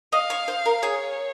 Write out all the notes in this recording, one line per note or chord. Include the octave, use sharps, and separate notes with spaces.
D#5 F5
C#5
C5
A#4
G#4 C#5